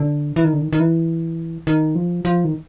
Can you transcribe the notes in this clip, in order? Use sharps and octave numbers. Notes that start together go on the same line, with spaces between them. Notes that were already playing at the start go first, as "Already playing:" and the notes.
Already playing: D3
E3
D#3
D3
D#3
D#3
E3
D#3
F3
F3
D#3